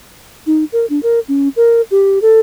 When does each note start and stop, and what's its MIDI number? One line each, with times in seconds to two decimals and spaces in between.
0.47 0.64 63
0.72 0.86 70
0.90 1.00 62
1.03 1.20 70
1.28 1.49 61
1.56 1.82 70
1.91 2.19 67
2.22 2.40 69